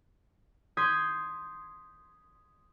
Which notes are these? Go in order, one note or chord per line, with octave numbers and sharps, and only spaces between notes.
C6 D#6 G6 G#6 B6